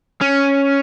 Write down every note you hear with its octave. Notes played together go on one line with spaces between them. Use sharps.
C#4